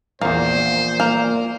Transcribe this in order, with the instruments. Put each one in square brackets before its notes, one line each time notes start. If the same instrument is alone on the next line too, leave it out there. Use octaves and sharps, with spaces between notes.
[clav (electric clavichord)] A#1 E2 [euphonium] A#2 [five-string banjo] A#3 [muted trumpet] C5
[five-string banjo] A#3